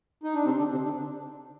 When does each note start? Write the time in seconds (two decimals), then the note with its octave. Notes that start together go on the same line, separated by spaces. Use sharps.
0.23 D#4
0.35 D4
0.45 C3 C4
0.58 D3 D4
0.71 C3 C4
0.84 D3 D4